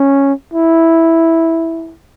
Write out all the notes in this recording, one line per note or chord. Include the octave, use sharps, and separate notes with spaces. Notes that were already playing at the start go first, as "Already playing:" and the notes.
Already playing: C#4
E4